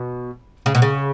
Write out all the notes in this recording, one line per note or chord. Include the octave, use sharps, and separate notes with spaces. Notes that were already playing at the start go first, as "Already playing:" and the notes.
Already playing: B2
C#3
B2
C#3